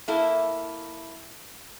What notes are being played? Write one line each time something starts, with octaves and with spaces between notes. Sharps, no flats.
A#3 E4 A4